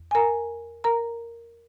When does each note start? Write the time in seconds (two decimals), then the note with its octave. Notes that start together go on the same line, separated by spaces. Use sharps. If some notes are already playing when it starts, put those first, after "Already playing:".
Already playing: E2
0.11 G#5
0.15 A#4 A#5
0.84 A#4 A#5